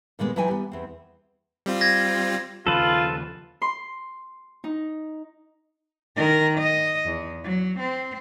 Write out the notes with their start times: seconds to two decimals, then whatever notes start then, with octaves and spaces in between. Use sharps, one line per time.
0.19 A#2 D#3 G3 G#3 B3
0.36 E3 F#3 D#4 G5 G#5
0.48 G3 B3
0.72 E2 C4
1.66 G3 C4 F4
1.81 G#6 A#6
2.67 D#2 C#3 F3 F4 A4 B4
3.62 C6
4.64 D#4
6.17 D#3 A#4
6.58 D#5
7.06 E2
7.43 F#3
7.79 C4